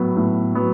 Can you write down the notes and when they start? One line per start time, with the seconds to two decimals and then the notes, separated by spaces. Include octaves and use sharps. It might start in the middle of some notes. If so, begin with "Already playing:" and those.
Already playing: A2 F#3 B3
0.16 A2
0.55 F#3 B3